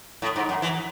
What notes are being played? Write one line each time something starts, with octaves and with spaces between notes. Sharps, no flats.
A2
G#2
F#2
E3